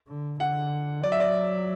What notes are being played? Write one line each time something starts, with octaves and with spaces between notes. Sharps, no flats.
D3
D3 F#5
F#3 D5
E5
D5